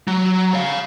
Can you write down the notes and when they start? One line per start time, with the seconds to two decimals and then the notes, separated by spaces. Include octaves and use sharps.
0.08 F#3
0.54 C#5 F5